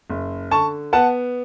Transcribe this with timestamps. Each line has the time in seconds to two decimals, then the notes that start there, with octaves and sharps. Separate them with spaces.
0.10 F#1
0.51 D3 A5 C#6
0.93 B3 F#5 A5